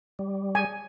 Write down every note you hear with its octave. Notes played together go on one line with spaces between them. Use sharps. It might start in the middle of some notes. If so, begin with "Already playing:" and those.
G3
G#5